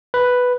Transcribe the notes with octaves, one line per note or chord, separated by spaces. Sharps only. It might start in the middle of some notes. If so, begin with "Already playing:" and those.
B4